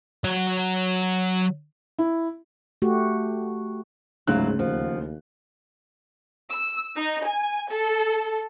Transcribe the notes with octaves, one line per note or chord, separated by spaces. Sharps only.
F#3 F#5
E4
A3 F#4 G4
D2 G#2 C#3 F#3 E4 F4 F#6
D#2 F3
E6
D#4
G#5
A4